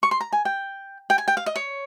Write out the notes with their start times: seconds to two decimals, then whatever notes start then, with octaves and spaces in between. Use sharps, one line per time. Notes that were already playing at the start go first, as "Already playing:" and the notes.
0.03 C#6
0.11 C6
0.20 A#5
0.32 G#5
0.45 G5
1.10 G5
1.18 G#5
1.28 G5
1.37 F5
1.46 D#5
1.56 C#5